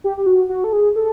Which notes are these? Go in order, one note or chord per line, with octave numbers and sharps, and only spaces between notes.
G4
G4
F#4
F#4
A4
G#4
A4